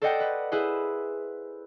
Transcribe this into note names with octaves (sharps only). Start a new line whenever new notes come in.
A4 C5 D5 D#5 F#5 G5
B4
E4 G#4 B4 C5